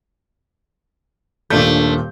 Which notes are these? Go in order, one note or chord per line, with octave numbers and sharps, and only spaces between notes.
D#1 A#2 A3 D4 G6